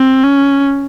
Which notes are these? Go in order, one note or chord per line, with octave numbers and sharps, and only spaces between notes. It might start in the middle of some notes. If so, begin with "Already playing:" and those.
Already playing: C4
C#4